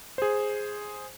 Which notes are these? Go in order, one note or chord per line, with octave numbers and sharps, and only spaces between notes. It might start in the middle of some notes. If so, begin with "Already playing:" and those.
G#4 C5